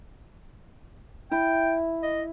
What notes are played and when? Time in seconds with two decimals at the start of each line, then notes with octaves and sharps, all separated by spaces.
1.32 E4 G5
2.03 D#5